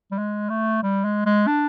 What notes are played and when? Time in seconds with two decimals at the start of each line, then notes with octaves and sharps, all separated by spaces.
0.11 G3
0.18 G#3
0.50 A3
0.83 G3
1.04 G#3
1.26 G#3
1.47 D4